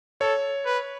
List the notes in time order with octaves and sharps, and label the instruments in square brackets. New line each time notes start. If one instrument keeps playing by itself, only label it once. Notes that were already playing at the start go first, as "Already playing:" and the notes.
[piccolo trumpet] A4 [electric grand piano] C#5
[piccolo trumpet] B4